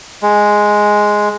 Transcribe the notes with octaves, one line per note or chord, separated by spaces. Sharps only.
G#3